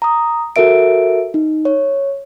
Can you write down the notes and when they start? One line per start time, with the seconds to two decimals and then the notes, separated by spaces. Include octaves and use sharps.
0.02 A#5 D#6
0.56 F#4 A4 A#4 E5 D7
1.34 D#4
1.65 C#5